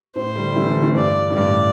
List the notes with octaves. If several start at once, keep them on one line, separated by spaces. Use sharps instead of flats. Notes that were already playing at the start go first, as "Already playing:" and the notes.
A2 C5
D3 G3
G3
E3 A3
D3 G3
E3 A3
G2 D5
A2
G2 D5